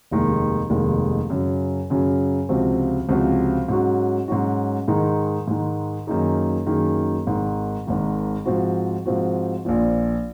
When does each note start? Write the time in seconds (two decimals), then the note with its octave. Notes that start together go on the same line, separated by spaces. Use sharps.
0.11 F1 D#2 D#3 G#3
0.70 F1 D#2 D#3 G#3
1.30 F#2 C#3 F#3
1.90 F#2 C#3 F#3
2.49 C#2 C3 F3 C4 F#4
3.09 C#2 C3 F3 C4 F#4
3.69 G#2 F#3 C#4 F#4
4.28 G#2 F#3 C#4 F#4
4.88 G#2 D#3 G#3 D#4
5.48 G#2 D#3 G#3 D#4
6.07 F#2 D#3 A#3 D#4 G#4
6.66 F#2 D#3 A#3 D#4 G#4
7.27 G#1 G#2 D#3
7.87 G#1 G#2 D#3
8.45 G#2 F3 C4 F#4
9.06 G#2 F3 C4 F#4
9.65 A#1 A#2 F3